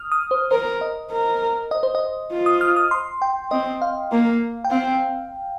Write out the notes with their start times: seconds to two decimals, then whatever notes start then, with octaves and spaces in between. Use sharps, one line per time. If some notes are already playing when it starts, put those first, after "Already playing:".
Already playing: D#6 F6
0.12 D#6
0.31 C5
0.51 A#4 C5
0.81 D#5
1.11 A#4
1.71 D#5
1.83 C5
1.95 D#5
2.32 F4
2.46 D#6
2.61 F6
2.76 D#6
2.91 C6
3.22 G5
3.51 C4 D#5
3.82 F5
4.12 A#3
4.65 G5
4.71 C4 F5